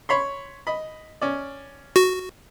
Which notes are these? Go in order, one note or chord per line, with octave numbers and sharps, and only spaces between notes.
C#5 B5 C6
D#5 B5
C#4 D5
F#4